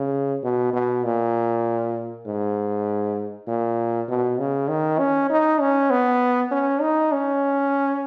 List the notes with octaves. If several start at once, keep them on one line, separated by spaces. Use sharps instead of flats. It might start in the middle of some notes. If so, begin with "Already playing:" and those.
Already playing: C#3
B2
B2
A#2
G#2
A#2
B2
C#3
D#3
C#4
D#4
C#4
B3
C#4
D#4
C#4